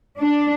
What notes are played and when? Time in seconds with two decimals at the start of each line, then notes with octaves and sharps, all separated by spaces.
0.19 D4